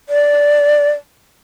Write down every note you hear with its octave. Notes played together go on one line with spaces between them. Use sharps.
D5